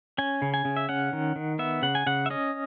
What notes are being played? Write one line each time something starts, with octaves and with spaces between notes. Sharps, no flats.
C#4 G#5
C#3
G#5
C#3
E5
C#4 F#5
D#3
D#3
B3 E5
C#3 F#5
G#5
C#3 F#5
E5
C#4 D#5